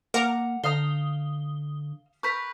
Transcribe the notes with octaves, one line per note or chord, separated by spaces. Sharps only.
A#3 A#4 F#5 A#5 D6
D3 F5 A#5 D#6 G7
A#4 B4 C#6 G6 B6